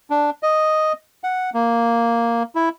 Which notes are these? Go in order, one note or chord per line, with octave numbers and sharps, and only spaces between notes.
D4
D#5
F#5
A#3
E4